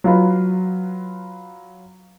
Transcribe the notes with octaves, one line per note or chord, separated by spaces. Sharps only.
F#3 F4 B4